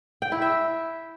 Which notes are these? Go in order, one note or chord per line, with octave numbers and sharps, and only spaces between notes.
G5
E4
E5